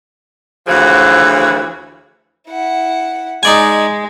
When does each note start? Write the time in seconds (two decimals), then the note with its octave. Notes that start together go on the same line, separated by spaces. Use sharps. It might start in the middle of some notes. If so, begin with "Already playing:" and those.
0.67 D2 C#3 E3 F3 F#4
2.48 E4 F#5
3.43 G#3 D#4 D5 G#5